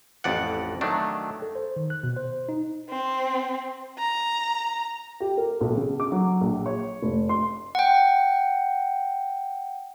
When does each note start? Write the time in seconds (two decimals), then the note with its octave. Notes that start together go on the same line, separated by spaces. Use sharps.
0.24 A1 F2 D5 F#5
0.81 D#3 F#3 A3 D4
1.42 A4
1.55 C5
1.76 D#3
1.90 F#6
2.03 B2
2.16 C5
2.49 D#4
2.89 C4
3.99 A#5
5.20 G4
5.37 A#4
5.61 B1
5.77 C#3
6.00 D6
6.12 F#3
6.41 A#1
6.66 C#5
7.02 F1
7.29 C6
7.75 F#5 G5